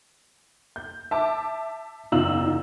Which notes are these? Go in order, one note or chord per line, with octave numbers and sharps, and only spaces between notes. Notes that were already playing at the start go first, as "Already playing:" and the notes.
G6
E5 A5 D6
F#1 E2 D#4 F4 E6 F#7